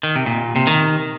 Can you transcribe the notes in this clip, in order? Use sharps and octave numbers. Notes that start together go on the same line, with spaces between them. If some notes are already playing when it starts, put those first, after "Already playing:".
D#3
C3
A#2
C3
D#3